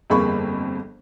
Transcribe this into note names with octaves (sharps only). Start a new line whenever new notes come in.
G1 F2 A#3 G#4 B5 C#6